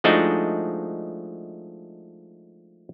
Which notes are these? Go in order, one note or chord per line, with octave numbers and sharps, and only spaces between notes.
F3 G#3 A3 D4 D#4 F#4